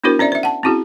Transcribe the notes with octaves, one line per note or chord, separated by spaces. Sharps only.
B3 D4 E4 F#4 A#4 C5
C#4 C5 D5 E5
C5 E5
F#5 A5
C4 C#4 E4 F#4 G#4